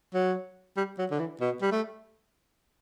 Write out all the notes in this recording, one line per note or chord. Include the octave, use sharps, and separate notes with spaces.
F#3
G3
F#3
D3
E3
B2
G3
A3